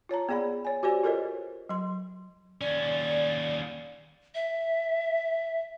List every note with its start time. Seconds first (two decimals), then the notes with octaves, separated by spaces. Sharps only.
0.09 F4 C#5 A5 A#5
0.29 B3 G#4 D5 F#5 B5
0.65 C#5 G#5
0.83 F#4 G4 C5 D5 G#5
1.04 F4 A4 A#4 C5 C#5 D#5
1.69 F#3 C6
2.61 D#2 C#4 D5
4.35 E5